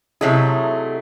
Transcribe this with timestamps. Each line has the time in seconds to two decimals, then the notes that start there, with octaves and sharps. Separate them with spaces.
0.21 C3 F#3 A3 D#4 E4 G#4